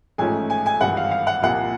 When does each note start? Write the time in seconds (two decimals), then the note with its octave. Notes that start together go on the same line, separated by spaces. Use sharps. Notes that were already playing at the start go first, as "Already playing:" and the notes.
0.18 A1 G#2 F3 A3 C#4 G#5
0.50 G#5
0.66 G#5
0.81 G#1 G2 E3 F#5
0.97 F5
1.11 F5
1.27 F#5
1.42 C2 A#2 F3 A#3 F#5